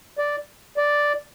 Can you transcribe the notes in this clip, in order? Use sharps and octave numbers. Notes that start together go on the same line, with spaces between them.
D5
D5